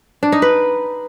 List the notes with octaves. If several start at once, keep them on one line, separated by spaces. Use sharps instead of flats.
D4
D#4
B4